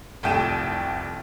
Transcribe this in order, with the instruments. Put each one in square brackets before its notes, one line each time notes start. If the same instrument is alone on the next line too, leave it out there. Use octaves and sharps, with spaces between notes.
[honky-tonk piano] F1 C2 A3 G5 D#7 E7